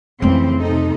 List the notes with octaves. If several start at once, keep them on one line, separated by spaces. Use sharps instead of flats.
F2 C#3 E3 A3 C4
C3 D#4 A4